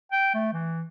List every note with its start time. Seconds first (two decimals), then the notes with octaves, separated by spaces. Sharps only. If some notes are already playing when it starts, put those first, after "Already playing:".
0.12 G5
0.34 A3
0.53 E3